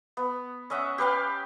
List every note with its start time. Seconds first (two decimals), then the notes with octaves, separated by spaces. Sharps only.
0.17 B3
0.70 C#4 D#5 E5 F#5
0.98 G4 B4 F5 G5